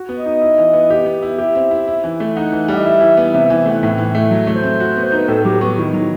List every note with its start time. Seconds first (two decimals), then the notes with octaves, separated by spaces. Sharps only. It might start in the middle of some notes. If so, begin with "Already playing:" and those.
Already playing: F#4
0.09 B3
0.17 D#5
0.26 D#4
0.41 E4
0.58 E3
0.73 B3
0.90 G4
1.06 B3
1.22 E4
1.38 G4 E5
1.55 C4
1.71 E4
1.88 E4
2.04 E3
2.20 A3
2.36 D#4 F#5
2.52 E3
2.68 G3
2.75 D#5
2.85 E4 E5
3.01 E3
3.17 B3
3.34 C3 E5
3.46 E5
3.50 E3
3.58 E5
3.66 A3 F#5
3.83 A2
3.98 E3
4.15 A3
4.31 F#3
4.47 A3
4.55 C5
4.63 C4
4.80 F#4
4.96 B3
5.05 C5
5.12 D#4 B4
5.28 A2 A4
5.44 F#3 G4
5.61 B3 F#4
5.77 D#3 E4
5.93 F#3 D#4